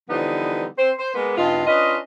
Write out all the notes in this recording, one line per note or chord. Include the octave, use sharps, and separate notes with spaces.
D3 E3 F3 G3 B3 D#4
C4 C5
C5
G#3 A#3 B3
G2 C#3 B3 D#4 F4
C#4 D4 F4 B4 D#5